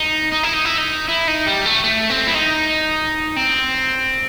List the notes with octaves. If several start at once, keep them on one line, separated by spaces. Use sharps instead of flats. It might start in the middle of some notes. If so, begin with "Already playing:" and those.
Already playing: D#4
D#4
E4
D#4
E4
D#4
E4
D#4
G3
A3
A3
C4
E4
D#4
C4